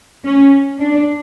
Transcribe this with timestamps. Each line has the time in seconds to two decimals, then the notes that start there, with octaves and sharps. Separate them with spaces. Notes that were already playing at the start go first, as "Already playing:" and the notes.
0.24 C#4
0.80 D4